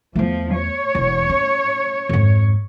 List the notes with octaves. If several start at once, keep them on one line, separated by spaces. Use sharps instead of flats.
E2 F3 A3
C#5
E1 E2
C#4
F2 G#2